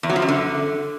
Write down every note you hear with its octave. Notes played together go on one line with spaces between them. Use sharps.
E2
F#3
F3
F#2
D3